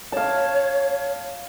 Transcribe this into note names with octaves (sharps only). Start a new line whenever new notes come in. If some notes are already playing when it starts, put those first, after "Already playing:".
C#5 F5 A5